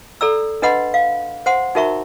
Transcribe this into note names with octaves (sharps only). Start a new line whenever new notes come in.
A4 D5 A#5 E6
D4 B4 D#5 F#5 B5 C6
F5
C5 F#5 C6
D#4 F#4 A#4 E5 A#5 C#6